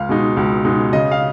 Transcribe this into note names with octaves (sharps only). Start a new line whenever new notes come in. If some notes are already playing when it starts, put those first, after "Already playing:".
Already playing: C#2 F5
B2 G#3 D#4
C#2
B2 G#3 D#4
C#3 D#5
F5